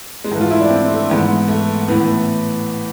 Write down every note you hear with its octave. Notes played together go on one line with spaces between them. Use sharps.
G#3
G#2 E3 A3
F4
E4
D4
C4
A3
G#2 E3 B3
A3
A2 E3 B3